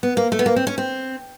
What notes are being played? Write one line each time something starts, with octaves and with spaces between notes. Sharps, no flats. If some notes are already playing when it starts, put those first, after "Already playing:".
B3
A#3
A3
B3
A#3
C4
C#4
C4